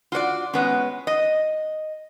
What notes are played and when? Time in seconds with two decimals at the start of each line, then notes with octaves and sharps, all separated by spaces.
0.12 F4 F#4 C#5 D5
0.53 G#3 B3 C#4
1.07 D#5